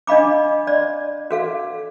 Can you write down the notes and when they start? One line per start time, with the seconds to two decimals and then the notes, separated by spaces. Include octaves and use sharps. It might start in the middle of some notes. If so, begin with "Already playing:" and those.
0.07 D4 D#5 F5 B5 D6
0.67 D5
1.31 F#4 A4 F5